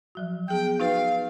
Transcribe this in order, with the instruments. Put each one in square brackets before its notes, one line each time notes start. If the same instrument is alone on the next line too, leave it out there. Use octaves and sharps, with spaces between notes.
[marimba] F3 F#3 F#4
[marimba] B3 G#4 G6 [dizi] G5
[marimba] D#4 F#4 B4 [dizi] F5